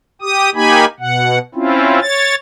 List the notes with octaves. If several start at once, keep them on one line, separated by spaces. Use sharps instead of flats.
G4 D#6
A#3 D#4 G4 G#5 B5
B2 F#5
C4 C#4 E4 F4
C#5 A6